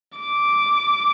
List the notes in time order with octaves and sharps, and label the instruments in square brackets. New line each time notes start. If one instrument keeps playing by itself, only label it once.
[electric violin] D6